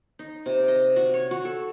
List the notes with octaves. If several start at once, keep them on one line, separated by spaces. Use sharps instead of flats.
D#4
C3
D#5
F#4
C#5
F#4
A4